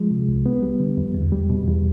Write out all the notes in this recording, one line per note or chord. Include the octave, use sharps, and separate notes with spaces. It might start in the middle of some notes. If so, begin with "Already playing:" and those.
Already playing: F3 G#3
C3
C2
B3
G3
D3
F2
E2
G3
B2
E2